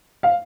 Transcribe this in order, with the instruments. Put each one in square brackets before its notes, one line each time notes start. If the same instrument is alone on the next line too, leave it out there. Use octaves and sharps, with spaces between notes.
[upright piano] F5